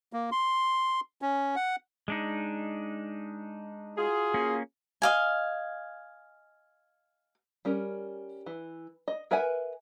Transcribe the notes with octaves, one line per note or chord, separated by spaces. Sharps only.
A#3
C6
C#4
F#5
G#3 D4 D#4
F4 F#4 G#4
A#3 C#4
D#5 F5 G#5
G3 C#4 A#4
E3
D#5
A#4 B4 E5 F#5 G#5